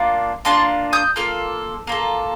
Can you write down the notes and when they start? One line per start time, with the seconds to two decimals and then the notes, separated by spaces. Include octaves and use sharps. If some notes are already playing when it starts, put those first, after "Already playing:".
Already playing: A#3 D4 F4
0.45 A#3 D4 F4 A5 C6
0.93 D#6 G6
1.16 A#3 F4 A4 F6
1.87 A#3 F4 A4